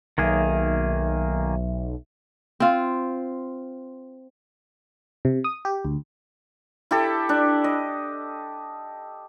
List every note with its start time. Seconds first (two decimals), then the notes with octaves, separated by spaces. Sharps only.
0.18 B1 D#3 F#3 A#3 G#4 E5
2.60 C4 F4
5.25 C3
5.44 D#6
5.65 G4
5.85 D2
6.91 E4 G4 A4
7.29 D4
7.64 D#5